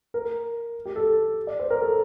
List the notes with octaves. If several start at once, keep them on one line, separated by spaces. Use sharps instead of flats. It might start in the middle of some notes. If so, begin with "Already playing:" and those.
A#4
G4
A4
D5
C5
A#4
A4